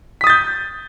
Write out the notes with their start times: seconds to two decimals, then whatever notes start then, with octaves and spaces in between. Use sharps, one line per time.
0.21 B6
0.24 D#6
0.27 A6
0.30 G6